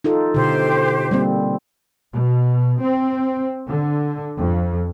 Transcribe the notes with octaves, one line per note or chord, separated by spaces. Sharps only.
D#4 F4 A4
B2 D3 G4 C5
G3 A#3 C4
B2
C4
D3
F2